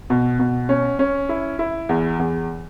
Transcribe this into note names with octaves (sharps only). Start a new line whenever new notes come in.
B2
B2
C#4
C#4
E4
E4
E2
E2